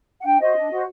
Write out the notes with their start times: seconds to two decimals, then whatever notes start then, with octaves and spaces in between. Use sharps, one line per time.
0.21 F#5
0.24 D4 G5
0.40 F#4 C5 D#5
0.56 D4
0.71 F#4 C5